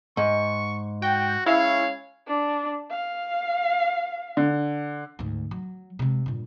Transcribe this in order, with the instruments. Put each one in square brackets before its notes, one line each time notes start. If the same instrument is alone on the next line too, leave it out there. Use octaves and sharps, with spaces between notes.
[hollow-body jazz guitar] G#2 [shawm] C#6
[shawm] F#4 [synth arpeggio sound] G5
[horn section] G#3 C#4 F5 [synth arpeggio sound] E4 [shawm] C#5
[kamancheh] D4
F5
[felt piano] D3
[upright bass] D2 G#2
F#3
C3 G#3
G2 A#2